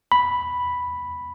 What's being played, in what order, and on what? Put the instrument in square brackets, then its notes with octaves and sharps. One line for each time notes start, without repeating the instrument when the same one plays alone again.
[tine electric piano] B5